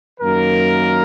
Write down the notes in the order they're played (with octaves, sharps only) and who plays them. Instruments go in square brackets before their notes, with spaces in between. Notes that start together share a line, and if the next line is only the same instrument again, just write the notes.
[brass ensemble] F#2 D#3 A#3 A#4